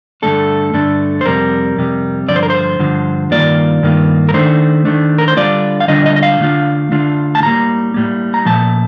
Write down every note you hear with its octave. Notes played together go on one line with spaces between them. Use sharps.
G2 D3 A3 D4 A4
G2 D3 A3 D4
C5
F2 C3 G3 A#4
F2 C3 G3
G2 D3 F3 D5
C5
A#4
C5
G2 D3 F3
G2 D#3 A#3 F4 D5
G2 D#3 A#3 F4
A#4
D#3 A3 D4 C5
D#3 A3 D4
A#4
C5
D3 G3 D4 F4 D5
F5
D3 G3 D4 F4 D#5
D#5
D#5
F5
D3 A3 D4 F4
D3 A3 D4 F4
A5
A2 G3 A#3 A#5
A2 G3 A#3
A#5
A#2 F3 A3 A5